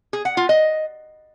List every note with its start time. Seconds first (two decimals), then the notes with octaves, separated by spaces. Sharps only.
0.13 G#4
0.25 F#5
0.37 F4
0.49 D#5